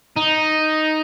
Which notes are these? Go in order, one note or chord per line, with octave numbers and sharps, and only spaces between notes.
D#4